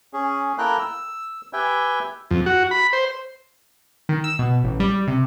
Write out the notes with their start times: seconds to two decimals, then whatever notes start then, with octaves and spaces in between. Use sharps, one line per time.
0.13 C#4 G#4
0.58 A#3 E4 A4 A#4 G5 F#6
0.79 E6
1.53 G4 B4 E5 G5 G#5
2.31 F2
2.46 F#4
2.71 B5
2.93 C5
4.09 D#3
4.24 E6
4.39 B2
4.64 A1
4.80 G3
5.08 C3